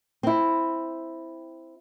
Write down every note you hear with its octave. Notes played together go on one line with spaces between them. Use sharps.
C4 E4